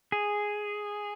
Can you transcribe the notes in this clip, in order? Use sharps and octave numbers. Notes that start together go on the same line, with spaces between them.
G#4